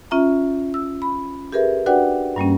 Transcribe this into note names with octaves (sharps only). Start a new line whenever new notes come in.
C#4 F4 E5 A#5
E6
B5
G4 G#4 A#4 B4 E5
D4 F#4 B4 D5 F#5 G5
G2 G3 A#3 C#4